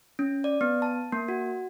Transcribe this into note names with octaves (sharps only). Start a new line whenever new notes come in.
C#4
D5
B3
A5
A#3
F#4